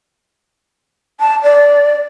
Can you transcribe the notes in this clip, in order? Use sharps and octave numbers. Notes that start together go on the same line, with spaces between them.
A5
D5